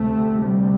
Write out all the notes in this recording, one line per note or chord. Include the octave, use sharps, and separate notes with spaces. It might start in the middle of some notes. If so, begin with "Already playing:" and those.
Already playing: D2 C3 A3
G3